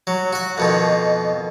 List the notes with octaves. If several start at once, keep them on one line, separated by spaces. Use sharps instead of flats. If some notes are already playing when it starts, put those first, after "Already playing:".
F#3
F#4 F#5
F2 B2 D#3